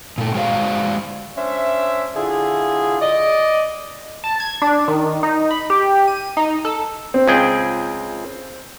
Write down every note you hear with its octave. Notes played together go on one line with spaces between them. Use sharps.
A#2 A3
G#3 F#4 C5 D5 F5
C#4 D4 C5 E5
D3 E4 F4 G#4
D5 D#5
A5
G#6
D4
D#3
D#4
B5
G4
D#7
D#4
A4
C4
C#2 G#4 G5